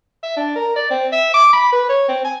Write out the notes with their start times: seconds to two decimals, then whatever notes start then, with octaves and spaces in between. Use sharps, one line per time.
0.23 E5
0.37 D4
0.56 A#4
0.76 D5
0.90 C4
1.12 E5
1.34 D6
1.53 B5
1.72 B4
1.89 C#5
2.08 C4
2.24 G#5